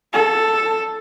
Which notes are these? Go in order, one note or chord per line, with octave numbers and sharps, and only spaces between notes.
A4